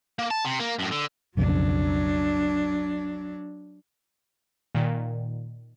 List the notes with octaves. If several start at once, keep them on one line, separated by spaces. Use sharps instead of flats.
A#3
A5
C3
A#3
F#2 A2
D3
B1 F2 C#3 F#3 D4
A#2 D#3